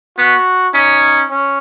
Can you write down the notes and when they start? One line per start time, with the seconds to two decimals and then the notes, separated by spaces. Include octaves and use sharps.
0.18 B3 F#4
0.74 C#4 D#4
1.29 C#4